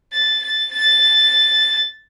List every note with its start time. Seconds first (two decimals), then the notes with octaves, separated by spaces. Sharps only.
0.13 A6
0.42 A6
0.72 A6